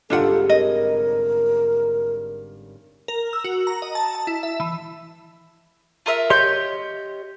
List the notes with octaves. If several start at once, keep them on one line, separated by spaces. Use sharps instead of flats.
G1 C2 G#2 D4 F4 A4 F#5
A#4 C#5 D#5
A#4
E6
F#4
A#5
D#5
A5
A5
E4
E5
E3
F4 A#4 E5
G4 C#5 D#5 C6 G6